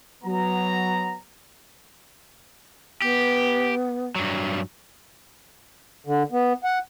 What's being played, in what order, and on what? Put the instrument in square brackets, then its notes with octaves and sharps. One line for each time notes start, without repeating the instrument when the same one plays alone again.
[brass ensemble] F#3 B3 A#5
[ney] B3 [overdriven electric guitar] G4
[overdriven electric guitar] G2 F#3
[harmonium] D3
B3
F#5